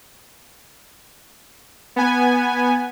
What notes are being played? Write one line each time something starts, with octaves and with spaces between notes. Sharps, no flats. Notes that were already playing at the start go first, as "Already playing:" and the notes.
B3 G#5